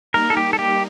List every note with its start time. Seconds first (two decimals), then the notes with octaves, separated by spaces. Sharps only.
0.14 G3 A#3 D#4 A#4
0.30 A4
0.37 G4
0.53 A4
0.59 G4